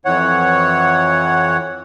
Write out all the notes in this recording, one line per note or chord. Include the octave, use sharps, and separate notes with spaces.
F2 E3 C#5 F#5